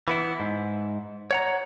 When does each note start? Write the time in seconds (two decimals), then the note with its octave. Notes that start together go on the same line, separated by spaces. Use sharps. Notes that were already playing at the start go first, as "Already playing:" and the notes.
0.08 E3 B3 E4
0.40 G#2
1.31 C#5 F#5 A#5